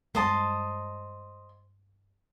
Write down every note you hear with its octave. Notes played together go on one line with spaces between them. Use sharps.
G2 G#3 C5 D#5 A5